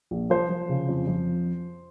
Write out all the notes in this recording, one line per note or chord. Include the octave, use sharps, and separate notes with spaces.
A#1
F3 C5
F3
C#3
F2
F2